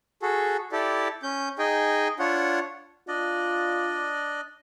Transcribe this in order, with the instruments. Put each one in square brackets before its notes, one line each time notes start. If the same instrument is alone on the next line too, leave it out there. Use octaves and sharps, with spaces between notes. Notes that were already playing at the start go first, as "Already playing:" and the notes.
[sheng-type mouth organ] F#4 G#4 A4
E4 G4 A4 D5
C#4 G6
D#4 G#4 D#5 G5 G#5
D4 F4 C#5 F#5
[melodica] D4 D5 D#5 [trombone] F4